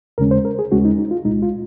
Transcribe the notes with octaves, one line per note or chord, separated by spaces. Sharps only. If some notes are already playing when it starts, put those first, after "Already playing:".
D#2 C#3 G#3 C#4 A#4
C5
A#4
G#4
D#2 C#3 G#3 C#4 F#4
D#4
D#4
F4
C2 A#2 G#3 D#4
F4